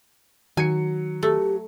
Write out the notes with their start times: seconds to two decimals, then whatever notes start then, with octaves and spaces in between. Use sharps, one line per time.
0.57 D#3 F#3 G#5 C#7
1.23 A3 G4